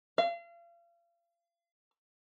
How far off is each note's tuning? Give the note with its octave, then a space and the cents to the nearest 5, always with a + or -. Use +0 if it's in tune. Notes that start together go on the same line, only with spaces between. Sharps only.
F5 -35